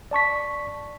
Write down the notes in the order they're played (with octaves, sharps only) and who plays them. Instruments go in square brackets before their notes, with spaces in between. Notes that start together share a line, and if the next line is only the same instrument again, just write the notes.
[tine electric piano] D5 A5 C#6 B6